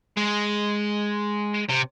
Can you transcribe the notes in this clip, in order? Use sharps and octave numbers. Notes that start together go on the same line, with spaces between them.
G#3
C3